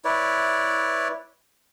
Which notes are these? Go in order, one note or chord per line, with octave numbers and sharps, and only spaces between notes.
E4 B4 C#5 D5